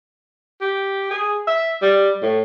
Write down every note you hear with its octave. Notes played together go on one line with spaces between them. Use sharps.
G4
G#4
E5
G3
A2